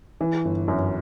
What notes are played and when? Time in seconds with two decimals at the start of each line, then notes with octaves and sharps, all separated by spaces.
0.21 E3
0.45 G1
0.68 F#2